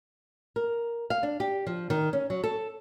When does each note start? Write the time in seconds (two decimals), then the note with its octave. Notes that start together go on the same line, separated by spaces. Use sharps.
0.56 A#4
1.10 F5
1.23 D4
1.40 G4
1.67 F3
1.90 D#3
2.13 C#4
2.30 F#3
2.44 A4